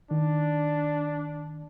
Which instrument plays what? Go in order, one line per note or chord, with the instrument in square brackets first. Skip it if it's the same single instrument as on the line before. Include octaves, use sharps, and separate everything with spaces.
[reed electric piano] D#3 [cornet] D4